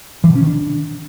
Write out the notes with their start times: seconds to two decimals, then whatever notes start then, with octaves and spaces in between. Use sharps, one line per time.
0.24 E3
0.30 B2
0.35 C#4
0.41 D#3
0.47 D4